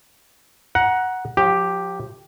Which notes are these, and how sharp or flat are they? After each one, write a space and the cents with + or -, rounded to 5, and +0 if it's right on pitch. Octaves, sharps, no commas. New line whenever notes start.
F#5 +0 A#5 +25
F3 +40 G4 +0